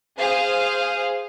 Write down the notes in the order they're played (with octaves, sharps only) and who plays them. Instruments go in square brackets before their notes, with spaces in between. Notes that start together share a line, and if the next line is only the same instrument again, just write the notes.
[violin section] G#4 C5 F5